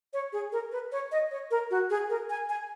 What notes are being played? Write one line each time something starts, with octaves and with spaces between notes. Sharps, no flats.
C#5
G#4
A#4
B4
C#5
D#5
C#5
A#4
F#4
G#4
A#4
G#5
G#5